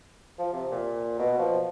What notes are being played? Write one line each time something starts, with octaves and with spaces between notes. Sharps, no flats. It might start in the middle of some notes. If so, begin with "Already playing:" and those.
F3
C3
A#2
B2
F3